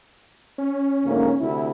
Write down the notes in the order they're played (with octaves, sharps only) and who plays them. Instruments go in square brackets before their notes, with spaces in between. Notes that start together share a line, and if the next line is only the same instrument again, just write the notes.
[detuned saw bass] C#4
[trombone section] D2 G#2 A#3
D2 C3 E4